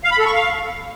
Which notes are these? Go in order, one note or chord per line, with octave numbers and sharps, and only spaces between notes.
F5
B5
A4
C#6
F5